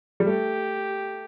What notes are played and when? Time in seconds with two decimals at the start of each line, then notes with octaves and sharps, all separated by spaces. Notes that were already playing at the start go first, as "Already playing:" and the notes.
0.20 G3
0.26 A3 G4